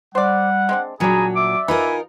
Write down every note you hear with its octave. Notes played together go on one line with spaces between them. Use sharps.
G3 C5 D5 F#5
G#3 C4 D4
A#2 F#3 G3 D4 G#4 G#5 A#5 B5
D5 E5 D6
D#4 F4 A#4 B4 G#5